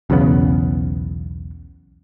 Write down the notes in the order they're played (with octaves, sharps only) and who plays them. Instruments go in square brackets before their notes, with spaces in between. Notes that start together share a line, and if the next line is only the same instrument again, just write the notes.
[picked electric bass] B1 E2 C#3 B3